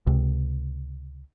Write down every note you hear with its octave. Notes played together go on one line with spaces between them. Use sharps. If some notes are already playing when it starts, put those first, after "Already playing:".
C#2 C3